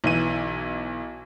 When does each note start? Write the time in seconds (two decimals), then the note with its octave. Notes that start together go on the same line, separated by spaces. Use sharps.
0.04 B1 E3 D#7